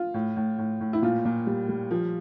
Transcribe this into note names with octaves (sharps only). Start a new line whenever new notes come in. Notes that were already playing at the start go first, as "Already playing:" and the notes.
Already playing: F4
A2
A2
A2
A2
E4
A#2 F4
A#2
G3
G3
F3